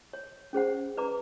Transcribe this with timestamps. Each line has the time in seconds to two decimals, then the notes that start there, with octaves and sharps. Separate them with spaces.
0.13 C#5
0.53 C#4 G#4 C5 F#5
0.97 B4 D5 A#5 D6